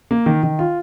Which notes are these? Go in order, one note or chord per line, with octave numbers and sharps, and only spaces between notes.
A#3
D#3
D#3
F4